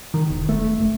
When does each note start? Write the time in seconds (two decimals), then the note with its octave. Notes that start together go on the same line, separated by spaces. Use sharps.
0.14 D#3
0.30 E1
0.49 A3
0.79 F#1